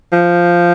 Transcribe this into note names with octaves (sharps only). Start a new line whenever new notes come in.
F3